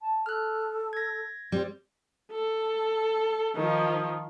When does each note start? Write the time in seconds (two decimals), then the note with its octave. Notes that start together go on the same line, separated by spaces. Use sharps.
0.01 A5
0.26 A4 F6 F#6
0.93 G#6 A#6
1.52 G3 C4
2.32 A4
3.55 D#3 F3